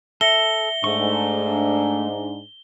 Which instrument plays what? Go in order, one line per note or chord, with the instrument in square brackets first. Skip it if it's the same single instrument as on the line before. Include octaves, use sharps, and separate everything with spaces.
[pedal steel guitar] A4 [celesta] E5 A#6 C#7 [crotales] G7
[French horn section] G#2 D4 [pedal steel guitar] A3 C#6